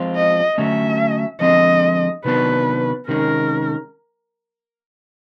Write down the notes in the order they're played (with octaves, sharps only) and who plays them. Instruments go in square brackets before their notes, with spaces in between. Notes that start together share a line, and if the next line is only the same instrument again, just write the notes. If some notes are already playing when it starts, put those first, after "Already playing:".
Already playing: [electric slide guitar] F3 G#3 C4 F4
[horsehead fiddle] D#5
[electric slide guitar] D3 F#3 A3 C#4 [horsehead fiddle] E5
[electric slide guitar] D3 F3 G#3 C4 [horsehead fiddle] D#5
[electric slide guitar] C3 D#3 F#3 B3 D4 [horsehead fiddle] B4
[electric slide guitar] C3 D#3 G#3 C#4 [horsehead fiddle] A#4